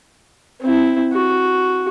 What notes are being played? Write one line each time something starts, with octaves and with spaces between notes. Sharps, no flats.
C4 E4
F#4